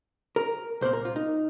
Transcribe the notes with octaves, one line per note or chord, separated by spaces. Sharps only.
A#4
C2 A#2 A#3 C5
A#4
F4
D#4